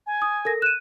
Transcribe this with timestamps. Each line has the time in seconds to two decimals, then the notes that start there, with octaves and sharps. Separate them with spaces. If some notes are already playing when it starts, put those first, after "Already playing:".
0.07 G#5
0.22 D#6
0.45 A4 A#4 A#6
0.62 F#6 D#7 E7